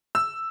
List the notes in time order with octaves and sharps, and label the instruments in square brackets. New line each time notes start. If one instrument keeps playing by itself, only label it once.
[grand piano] E6